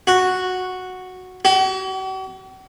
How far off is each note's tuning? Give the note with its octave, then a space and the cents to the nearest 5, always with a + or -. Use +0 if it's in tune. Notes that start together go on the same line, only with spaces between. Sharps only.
F#4 -5
F#4 +45